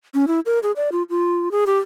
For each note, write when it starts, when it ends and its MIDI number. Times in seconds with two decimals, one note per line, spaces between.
0.14 0.25 61
0.28 0.40 64
0.46 0.59 70
0.63 0.72 68
0.76 0.89 74
0.92 1.03 65
1.10 1.49 65
1.52 1.64 68
1.67 1.77 67